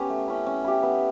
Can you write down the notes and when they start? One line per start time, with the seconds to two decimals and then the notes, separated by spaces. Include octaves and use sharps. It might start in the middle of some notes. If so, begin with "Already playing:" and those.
Already playing: B3 C#4 G4
0.10 A3
0.28 C#4 E4
0.47 C#4
0.64 E4 G4
0.83 B3